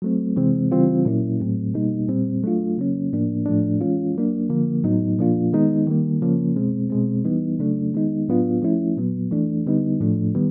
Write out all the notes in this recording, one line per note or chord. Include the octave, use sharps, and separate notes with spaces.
F#3 A3 C4
C3 E3 G#3 C4
C#3 E3 G3 C4 F4
A#2 F#3 A#3 C#4 E4
A2 F#3 A3 C4
B2 G3 A#3 D#4
A#2 G3 C4
F#3 A3 D4 F4
C#3 F#3 A#3 C#4
A2 F3 A#3 D4
A2 F3 A3 D4
E3 G#3 C#4 F4
F#3 A#3 D4
D3 F3 A#3
A2 F#3 B3 D#4
A#2 F3 A#3 D4 F4
D#3 G#3 B3 D#4
D#3 G3 A#3
C#3 F3 A#3 C#4
B2 G#3 C4
B2 G#3 C4
E3 G3 B3 D#4
C#3 F#3 A3 D4
D#3 G#3 B3 D#4
A2 F#3 B3 D4 F4
F3 A3 C#4 E4
A#2 F#3 B3
E3 A3 D4
D3 G3 B3 D#4
A2 F3 A3 D4
D#3 G3 B3